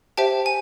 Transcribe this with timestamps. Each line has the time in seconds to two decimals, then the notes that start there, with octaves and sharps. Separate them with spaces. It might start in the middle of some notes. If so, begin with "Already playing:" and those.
0.17 G4 C5 E5 G5 A5
0.46 G#5